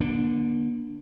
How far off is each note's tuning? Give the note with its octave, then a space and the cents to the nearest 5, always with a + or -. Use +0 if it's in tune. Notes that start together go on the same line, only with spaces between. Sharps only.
D3 +0 A#3 +40 D4 +5